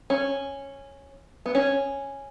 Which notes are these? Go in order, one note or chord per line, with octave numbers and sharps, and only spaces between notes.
C#4
B3
C#4